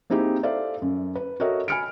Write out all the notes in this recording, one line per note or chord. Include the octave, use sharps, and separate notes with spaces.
A#3 C4 D#4 E4 G4 G#4
A4 C5 D5 E5 F5
F#2
B4
F#4 A4 A#4 C#5 D#5 E5
G#5 B5 F6 C#7 D7